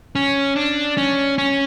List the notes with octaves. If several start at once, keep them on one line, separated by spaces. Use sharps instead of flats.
C#4
D4
C#4
C#4